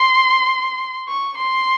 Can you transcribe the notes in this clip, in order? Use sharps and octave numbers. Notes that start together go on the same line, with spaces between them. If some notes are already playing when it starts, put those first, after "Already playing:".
Already playing: C6
C#6
C6